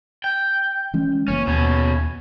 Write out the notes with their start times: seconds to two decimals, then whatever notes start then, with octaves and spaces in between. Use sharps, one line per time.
0.24 G5
0.94 E3 G#3 C#4
1.28 F#1 E3 A#3 C#4
1.47 D#2 B2 C#4